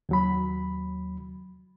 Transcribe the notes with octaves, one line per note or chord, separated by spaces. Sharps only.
D#2 F#3 B5